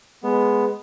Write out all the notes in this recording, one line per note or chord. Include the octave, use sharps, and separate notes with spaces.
G#3 B3